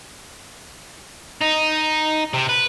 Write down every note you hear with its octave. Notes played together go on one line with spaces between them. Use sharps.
D#4
C3
B4